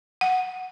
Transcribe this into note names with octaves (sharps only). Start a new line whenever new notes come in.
F#5